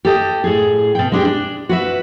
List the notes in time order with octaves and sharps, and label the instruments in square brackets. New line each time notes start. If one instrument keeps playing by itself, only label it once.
[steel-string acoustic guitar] G4 A4 D#5
A2 G#4
B2 G5
G#3 D4 G4
D4
F#4 B4 E5